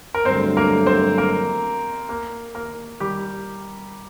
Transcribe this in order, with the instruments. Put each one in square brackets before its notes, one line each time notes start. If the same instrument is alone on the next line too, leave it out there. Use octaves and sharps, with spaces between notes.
[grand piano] A#4
[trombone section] G2 D3 F#3 A3 [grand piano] C4 C5
[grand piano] A#3 A#4
C4 C5
A#3 A#4
A#3 A#4
A#3 A#4
G3 G4